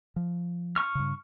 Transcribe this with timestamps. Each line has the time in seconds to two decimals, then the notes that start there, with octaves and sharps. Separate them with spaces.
0.16 F3
0.76 C#6 F6
0.95 G2 C#3